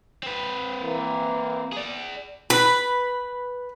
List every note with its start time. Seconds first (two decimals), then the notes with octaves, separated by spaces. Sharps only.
0.23 C4 B4
0.82 E3 A#3
1.73 G#4 D5
2.50 B4